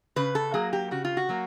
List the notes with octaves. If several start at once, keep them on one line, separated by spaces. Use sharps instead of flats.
C#3 B4
A4
F#3 A#3 G#4
G4
C#3 F#4
F4
F#4
F#3 A#3